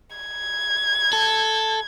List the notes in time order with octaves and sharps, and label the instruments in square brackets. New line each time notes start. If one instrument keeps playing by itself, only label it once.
[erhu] G#6
[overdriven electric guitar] A4